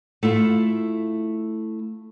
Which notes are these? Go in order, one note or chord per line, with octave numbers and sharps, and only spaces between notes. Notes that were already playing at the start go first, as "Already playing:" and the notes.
A3 E4 F4 F5